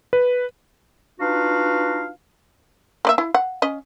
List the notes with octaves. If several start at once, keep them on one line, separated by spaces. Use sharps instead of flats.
B4
D4 D#4 F4 F#4 B4 F5
A#3 D5 E5
E4
F#5
C#4 D#5